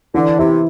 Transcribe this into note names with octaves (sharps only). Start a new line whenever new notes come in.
D3 E3
C3 E4